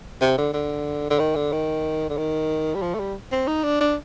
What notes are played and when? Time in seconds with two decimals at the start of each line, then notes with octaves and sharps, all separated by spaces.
0.21 C3
0.38 D3
0.53 D3
1.10 D3
1.19 D#3
1.35 D3
1.52 D#3
2.09 D3
2.17 D#3
2.75 G3
2.82 F3
2.95 A3
2.99 G3
3.32 C4
3.47 D#4
3.63 D4
3.80 D4